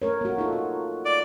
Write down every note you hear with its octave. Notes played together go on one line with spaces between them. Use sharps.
A3 A#4 C#5
A#3 F#4
D#4 F4 A4
F#4
D5